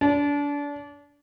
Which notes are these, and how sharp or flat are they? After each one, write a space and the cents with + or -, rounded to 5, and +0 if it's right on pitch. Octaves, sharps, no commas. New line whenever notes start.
D4 -30